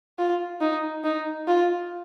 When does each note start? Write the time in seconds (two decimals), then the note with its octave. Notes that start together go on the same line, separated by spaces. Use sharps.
0.18 F4
0.61 D#4
1.04 D#4
1.47 F4